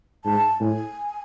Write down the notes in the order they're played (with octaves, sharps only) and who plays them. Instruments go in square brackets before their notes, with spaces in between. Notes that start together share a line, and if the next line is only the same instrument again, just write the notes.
[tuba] G#2 [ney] A5
[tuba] A2 [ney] G#5